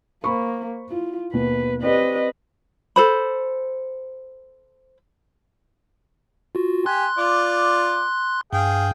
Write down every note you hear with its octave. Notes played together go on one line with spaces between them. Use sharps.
A#3 C5 B5 C#6
E4 F4
D#2 B2 B4
C4 G4 B4 D5 D#5
A4 C5 B5
F4 F#4
G4 G#5 C6 F#6
F4 D5 D6
G2 G#4 F5 G5